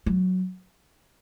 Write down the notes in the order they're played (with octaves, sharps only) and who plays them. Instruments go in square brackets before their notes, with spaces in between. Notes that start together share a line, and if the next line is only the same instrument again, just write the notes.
[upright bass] F#3